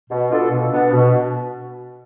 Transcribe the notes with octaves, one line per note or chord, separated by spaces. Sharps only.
B2
B3 D4 F4 A4
B2
B3 D4
B2